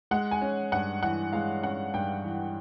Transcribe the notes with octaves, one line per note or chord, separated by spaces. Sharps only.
G#3 F#5
G#5
C#4
G2 F#5
E3 F#5
G#3 F5
C#4 F#5
G2 G5
E3